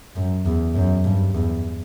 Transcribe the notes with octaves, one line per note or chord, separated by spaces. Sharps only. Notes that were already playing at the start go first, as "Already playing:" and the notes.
F#2
E2
F#2
G2
E2